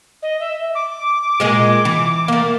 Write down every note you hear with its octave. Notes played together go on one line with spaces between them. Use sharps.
D#5
E5
D6
A#2 G#3 G#4
E3
A3 A#3